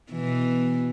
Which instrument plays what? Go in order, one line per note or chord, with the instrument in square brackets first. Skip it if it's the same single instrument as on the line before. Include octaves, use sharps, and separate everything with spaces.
[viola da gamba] B2 E3